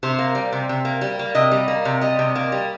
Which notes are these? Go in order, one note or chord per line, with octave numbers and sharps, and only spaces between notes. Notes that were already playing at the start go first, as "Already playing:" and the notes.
C3 C5
A#3
G3
C3
C3
A#3
G3
A#3
C3 D#5
G3
A#3
C3
G3 D#5
C3
A#3
G3